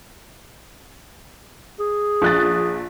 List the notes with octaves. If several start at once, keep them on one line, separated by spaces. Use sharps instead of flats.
G#4
A#1 F#6 A6